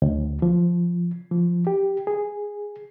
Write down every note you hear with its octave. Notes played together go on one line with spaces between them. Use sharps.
D2
F3
F3
G4
G#4